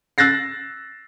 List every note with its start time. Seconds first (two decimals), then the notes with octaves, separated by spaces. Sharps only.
0.18 E6 F#6 A6 A#6 C7